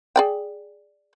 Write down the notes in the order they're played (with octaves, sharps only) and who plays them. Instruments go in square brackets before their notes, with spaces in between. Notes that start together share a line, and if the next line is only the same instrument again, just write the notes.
[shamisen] G#4 D5 G5